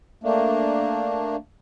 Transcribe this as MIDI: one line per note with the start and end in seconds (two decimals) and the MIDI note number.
0.24 1.36 57
0.24 1.36 58
0.24 1.36 62